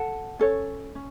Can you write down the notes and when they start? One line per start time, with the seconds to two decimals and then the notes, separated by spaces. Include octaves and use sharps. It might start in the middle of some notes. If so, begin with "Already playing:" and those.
Already playing: A4 F#5 A5
0.39 C#4 A4 C#5
0.95 C#4